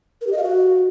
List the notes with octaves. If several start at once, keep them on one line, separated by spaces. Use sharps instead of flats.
A#4
G4
D#5
F5
F#4